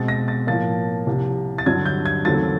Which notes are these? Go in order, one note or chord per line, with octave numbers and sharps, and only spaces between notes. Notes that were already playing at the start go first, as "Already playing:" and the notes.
Already playing: B2 G#3 C4 A6
A#6
A6
A2 F3 A#3 A6
C2 C3 F3
A6
G2 D3 F#3 G#6
G6
G#6
D#2 C#3 F#3 A3 C4 A6